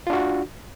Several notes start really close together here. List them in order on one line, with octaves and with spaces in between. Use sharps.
F4 D4 F#4